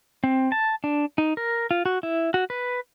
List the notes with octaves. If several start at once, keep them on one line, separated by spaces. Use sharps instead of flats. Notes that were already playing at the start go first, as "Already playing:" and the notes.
C4
A5
D4
D#4
A#4
F4
F#4
E4
F#4
B4